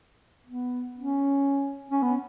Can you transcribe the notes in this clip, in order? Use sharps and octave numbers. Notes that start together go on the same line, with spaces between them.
B3
C#4
C#4
B3